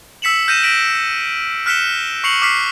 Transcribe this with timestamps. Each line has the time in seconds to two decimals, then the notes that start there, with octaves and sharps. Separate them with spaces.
0.22 E6 B6 C#7 E7 F#7
0.47 F6 G6 A#6 D#7 E7
0.63 G6 A#6 B6 D7 F#7
1.66 F6 F#6 B6 C#7 E7 G7
2.24 C#6 C7 C#7 F7 F#7
2.42 D6 F6 B6 C7